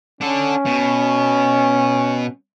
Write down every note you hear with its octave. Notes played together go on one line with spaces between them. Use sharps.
C#4 D4 A4
B2